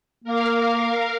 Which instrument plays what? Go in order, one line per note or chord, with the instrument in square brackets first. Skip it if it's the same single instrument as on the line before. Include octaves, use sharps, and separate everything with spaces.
[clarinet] A#3 [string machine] A#4 F5